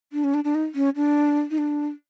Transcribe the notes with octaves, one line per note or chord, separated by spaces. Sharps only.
D4
C#4
D4
D4
D#4
C#4
D4
D#4
D4